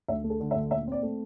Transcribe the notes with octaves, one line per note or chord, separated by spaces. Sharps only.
D2 E5
A3
A4
D3
E5
D2
A#2 E5
C4 D5
A3